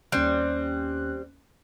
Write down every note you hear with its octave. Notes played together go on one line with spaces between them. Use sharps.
D#2 G3 C4 C#4 F#6